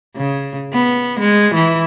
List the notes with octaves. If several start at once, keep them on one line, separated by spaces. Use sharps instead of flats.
C#3
B3
G#3
E3